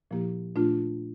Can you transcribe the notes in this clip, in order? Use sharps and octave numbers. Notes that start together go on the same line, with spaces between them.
A#2 F3 A#3 E4 G4
A#2 A3 D4 F4